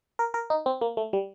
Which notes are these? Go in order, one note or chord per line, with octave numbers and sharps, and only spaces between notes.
A#4
A#4
D#4
C4
A#3
A3
G3